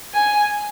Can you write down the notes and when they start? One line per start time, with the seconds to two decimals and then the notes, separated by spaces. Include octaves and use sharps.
0.14 G#5